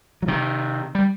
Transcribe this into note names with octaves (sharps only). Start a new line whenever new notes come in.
F#3
C3 D#3
G3